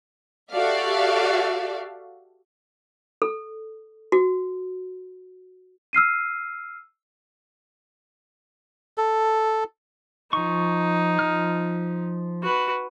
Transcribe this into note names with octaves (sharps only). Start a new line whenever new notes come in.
F#4 G4 A4 D5 E5 F5
A4
F#4
E6 F6 C7 D#7
A4
F3 D#4 C#6
F3 F6
F#4 B4